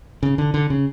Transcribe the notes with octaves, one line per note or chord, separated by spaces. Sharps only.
C#3
D3
D3
C#3